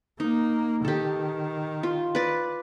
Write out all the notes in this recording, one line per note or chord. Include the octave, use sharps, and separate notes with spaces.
A#3 D#4
D#3 G4 A4
F4
B4 D5